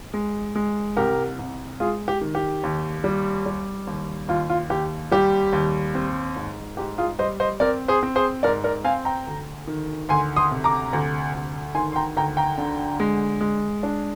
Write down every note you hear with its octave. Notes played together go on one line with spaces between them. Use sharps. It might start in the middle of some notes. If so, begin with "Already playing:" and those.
G#3
G#3
C2 G4 A#4
C2
G#3 F4 G#4
G4
D#3
G4
D#2
G3
G3
D#2
D#2 F4
F4
D#2 G4
G3 G4
D#2
C4
G#2
G#2 G4
F4 G#4
G3 C5 D#5
C5 D#5
C4 A#4 D5
G#4 C5
C4
G#4 C5
G#2 A#4 D5
A#4 D5
C4 F5 G#5
G5 A#5
D2
D#3
D2 G#5 C6
C6 D#6
C3
A#5 D6
D2
D2
D#3 G#5 C6
C6
G5 A#5
D2 G5 A#5
G5 A#5
D3
G#3
G#3
D4